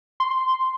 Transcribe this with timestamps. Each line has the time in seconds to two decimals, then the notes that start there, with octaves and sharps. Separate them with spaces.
0.20 C6